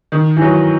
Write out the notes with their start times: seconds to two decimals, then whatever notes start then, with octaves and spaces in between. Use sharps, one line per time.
0.12 D#3
0.36 E3
0.41 F#3